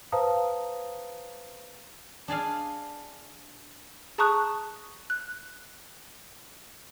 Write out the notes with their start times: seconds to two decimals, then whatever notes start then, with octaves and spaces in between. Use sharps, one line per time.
0.12 B4 C5 F5 A5 A#5 D#6
2.28 D4 G#4 D5 F5
4.18 G#4 A5 A#5 C#6 D#6 F#6
5.10 F#6